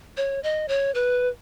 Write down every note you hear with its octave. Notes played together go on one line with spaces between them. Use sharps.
C#5
D#5
C#5
B4